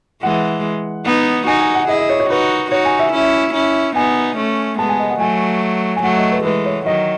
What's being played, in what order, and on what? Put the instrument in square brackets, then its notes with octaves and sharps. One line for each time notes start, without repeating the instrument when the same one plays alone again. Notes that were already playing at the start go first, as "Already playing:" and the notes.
[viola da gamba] E3 G#3 [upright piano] F#5
[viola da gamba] B3 D#4 [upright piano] F#5
[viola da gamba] D#4 F#4 [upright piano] G#5
[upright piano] G#5
F#5
[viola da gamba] E4 G#4 [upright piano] D#5
[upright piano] D#5
C#5
C#5
[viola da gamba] D#4 F#4 [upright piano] B4
[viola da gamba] D#4 F#4 [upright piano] C#5
[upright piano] G#5
E5
[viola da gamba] C#4 E4
C#4 E4
[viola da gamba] B3 D#4 [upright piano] G#5
[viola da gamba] A3 C#4
[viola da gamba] G#3 B3 [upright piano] A5
[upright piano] G#5
D#5
F#5
[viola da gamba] F#3 A3 [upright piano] G#5
[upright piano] G#5
[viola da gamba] F#3 A3 [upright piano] F#5
[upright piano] D#5
B4
A4
[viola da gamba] E3 G#3 [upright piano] B4
[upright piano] C#5
[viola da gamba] D#3 F#3 [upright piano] D#5